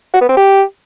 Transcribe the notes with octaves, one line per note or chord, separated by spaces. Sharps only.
F#4
B3
C4
G4